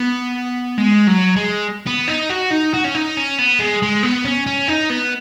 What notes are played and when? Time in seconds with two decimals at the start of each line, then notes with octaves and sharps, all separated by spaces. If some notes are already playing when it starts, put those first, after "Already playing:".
Already playing: B3
0.78 G#3
1.07 F#3
1.36 G#3
1.87 B3
2.08 D#4
2.30 F#4
2.51 D#4
2.74 F#4
2.85 C#4
2.95 D#4
3.17 C#4
3.39 B3
3.60 G#3
3.82 G#3
4.03 B3
4.25 C#4
4.47 C#4
4.68 D#4
4.90 B3